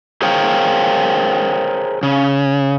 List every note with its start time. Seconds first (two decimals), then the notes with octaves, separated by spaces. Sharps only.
0.22 G#4 A#4 C5 C#5 F5 G5
2.03 C#3